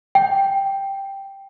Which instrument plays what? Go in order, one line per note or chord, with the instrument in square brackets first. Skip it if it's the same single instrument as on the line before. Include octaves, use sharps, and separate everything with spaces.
[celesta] G5